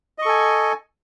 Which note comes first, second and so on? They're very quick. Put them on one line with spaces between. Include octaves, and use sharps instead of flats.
D#5 C#6 A4 G#5